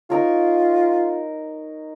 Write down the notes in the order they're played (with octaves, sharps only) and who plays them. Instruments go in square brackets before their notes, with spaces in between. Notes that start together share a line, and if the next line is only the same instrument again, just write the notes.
[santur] D#4 A#4 C#5 [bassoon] F4